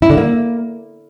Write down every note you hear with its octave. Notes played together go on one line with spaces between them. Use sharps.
E4
D3
A#3